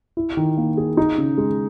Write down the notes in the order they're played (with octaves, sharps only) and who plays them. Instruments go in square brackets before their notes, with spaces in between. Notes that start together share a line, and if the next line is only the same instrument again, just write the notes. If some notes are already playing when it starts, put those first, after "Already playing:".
[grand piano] E4
D#3
A#3
G#4
D#4
C#3
G#3